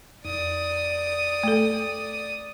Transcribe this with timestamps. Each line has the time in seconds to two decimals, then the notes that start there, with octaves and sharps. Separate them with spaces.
0.25 F2 D5 D#6
1.43 A3 A4